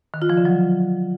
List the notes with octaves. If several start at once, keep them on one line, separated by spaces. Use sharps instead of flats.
D#3
F4
F3
D3
F#3